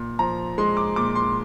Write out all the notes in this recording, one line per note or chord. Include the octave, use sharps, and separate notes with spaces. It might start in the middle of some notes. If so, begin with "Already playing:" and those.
Already playing: A#2
F3 A#5
G#3 C6
D6
A#2 D6
C6